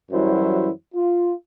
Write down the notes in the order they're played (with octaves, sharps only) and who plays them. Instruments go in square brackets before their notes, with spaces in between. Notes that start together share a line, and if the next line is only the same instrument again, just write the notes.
[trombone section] F#2 E3 F#3 G3 E4 C5
F4